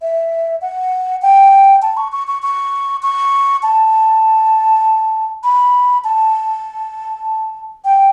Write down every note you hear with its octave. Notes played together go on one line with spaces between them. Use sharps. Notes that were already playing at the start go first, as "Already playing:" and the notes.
E5
F#5
G5
A5
C#6
C#6
C#6
C#6
C#6
A5
B5
A5
G5